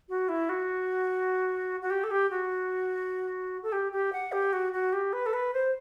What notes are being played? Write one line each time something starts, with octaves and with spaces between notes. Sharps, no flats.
F#4
E4
F#4
F#4
G4
A4
G4
F#4
A4
G4
G4
F#5
G4
F#4
F#4
G4
B4
A4
B4
C5